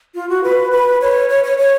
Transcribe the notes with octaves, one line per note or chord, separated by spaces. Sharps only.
F4
F#4
B4
B4
C#5
C#5
C#5
C#5